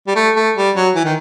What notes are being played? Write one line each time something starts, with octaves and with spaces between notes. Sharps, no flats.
G3
A3
A3
G3
F#3
E3
D#3